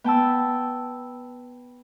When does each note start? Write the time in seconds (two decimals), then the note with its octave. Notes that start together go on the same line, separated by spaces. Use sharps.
0.04 B3 G5 A5 E6